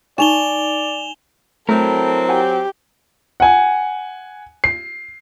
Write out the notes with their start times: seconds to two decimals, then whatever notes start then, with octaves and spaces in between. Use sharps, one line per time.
0.18 D#4 D5 G#5 C#6 E7 F7 G7
1.69 F#3 A3 C4 E4 A4 A#4
2.29 G4 F#5 G#5
3.40 F#5 G#5
4.64 C7